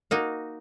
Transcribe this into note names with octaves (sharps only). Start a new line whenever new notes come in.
A#3 D#4 F#4